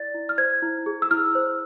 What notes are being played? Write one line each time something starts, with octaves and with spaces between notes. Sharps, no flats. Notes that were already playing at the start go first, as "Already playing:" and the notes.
Already playing: E4 D5 A6
E4
F6
C5 G#6
E4
G#4
E6
E4 F6
C5